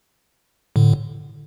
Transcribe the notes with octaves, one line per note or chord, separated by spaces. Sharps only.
A2 D3